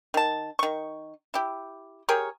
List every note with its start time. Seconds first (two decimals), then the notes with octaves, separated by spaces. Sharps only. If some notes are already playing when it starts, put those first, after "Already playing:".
0.14 D#3 A5
0.59 D#3 C#6
1.34 E4 G4
2.09 G4 G#4 A#4 C#5